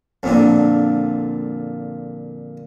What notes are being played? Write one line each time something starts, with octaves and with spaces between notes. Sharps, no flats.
F2 A#2 D3